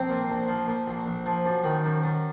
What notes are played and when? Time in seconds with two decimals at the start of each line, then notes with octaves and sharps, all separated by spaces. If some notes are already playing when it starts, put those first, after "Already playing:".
Already playing: A#1 C4
0.10 A#2
0.30 A#1
0.48 F3
0.67 A#2
0.87 A#1
1.06 A#1
1.26 F3
1.45 F#2
1.64 D#3
1.84 F#2
2.04 F#2